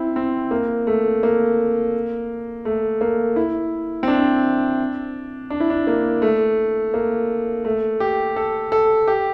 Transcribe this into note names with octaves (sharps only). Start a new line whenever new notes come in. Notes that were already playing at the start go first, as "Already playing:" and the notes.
Already playing: C4 E4
C4
A#3
A3
A#3
A3
A#3
E4
C4
D4
D4
E4
D4
A#3
A3
A#3
A3
G4
A4
A4
G4